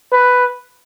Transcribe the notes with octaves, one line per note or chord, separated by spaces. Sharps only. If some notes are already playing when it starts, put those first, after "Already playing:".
B4